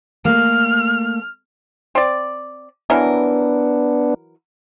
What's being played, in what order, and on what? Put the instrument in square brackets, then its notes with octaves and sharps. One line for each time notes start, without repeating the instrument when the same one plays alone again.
[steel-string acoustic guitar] A3 A#3 [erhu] F6
[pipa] C4 D5
[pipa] E3 F#3 A#4 [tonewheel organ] B3 D4